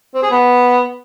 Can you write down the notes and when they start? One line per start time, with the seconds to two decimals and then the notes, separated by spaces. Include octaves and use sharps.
0.14 C4
0.23 G#4
0.31 B3